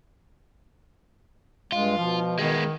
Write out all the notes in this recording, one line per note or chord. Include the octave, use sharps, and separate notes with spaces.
G2 G#3 F4
B2 F3
D#3 G#3 B3